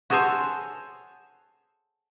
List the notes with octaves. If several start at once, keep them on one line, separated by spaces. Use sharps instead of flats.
F#4 G#4 A4 C5 C#5